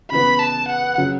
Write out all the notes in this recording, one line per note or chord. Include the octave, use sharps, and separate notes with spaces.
C#3 E3 B3 B5
A5
F#5
C#3 F#3